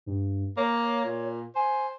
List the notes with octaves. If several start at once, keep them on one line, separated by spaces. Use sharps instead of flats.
G2
A#3 C#5
A#2
C5 G#5